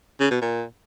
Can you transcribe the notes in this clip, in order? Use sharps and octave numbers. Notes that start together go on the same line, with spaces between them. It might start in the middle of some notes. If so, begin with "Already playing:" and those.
C#3
B2
A#2